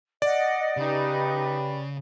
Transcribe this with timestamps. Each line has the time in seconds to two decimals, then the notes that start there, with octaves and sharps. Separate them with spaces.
0.22 D5 D#5 F#5
0.77 C#3 D#4 G4 B4